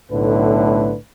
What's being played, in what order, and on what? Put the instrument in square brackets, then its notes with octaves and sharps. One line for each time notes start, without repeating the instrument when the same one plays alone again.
[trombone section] B1 A2 D3 A3 B4